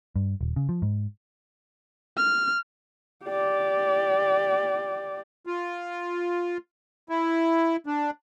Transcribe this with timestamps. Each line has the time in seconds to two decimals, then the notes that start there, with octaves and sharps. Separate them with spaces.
0.16 G2
0.41 D#1
0.56 C#3
0.69 F3
0.82 G#2
2.17 F6
3.25 G4 D5
5.46 F4
7.09 E4
7.86 D4